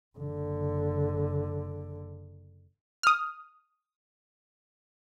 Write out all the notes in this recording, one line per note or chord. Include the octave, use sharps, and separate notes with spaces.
F#1 D3
D#6 F6